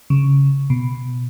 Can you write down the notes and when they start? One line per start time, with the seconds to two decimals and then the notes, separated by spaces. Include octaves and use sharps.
0.10 C#3
0.70 B2